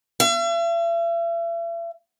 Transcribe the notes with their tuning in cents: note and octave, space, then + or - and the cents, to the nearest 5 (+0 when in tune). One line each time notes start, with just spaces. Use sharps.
E5 +40